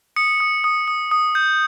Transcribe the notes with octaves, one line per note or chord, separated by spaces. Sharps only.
D#6 C#7
D#6
D#6
D#6
D#6
G6